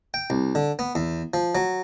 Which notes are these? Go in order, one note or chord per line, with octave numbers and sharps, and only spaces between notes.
G5
C2
D3
B3
E2
F3
F#3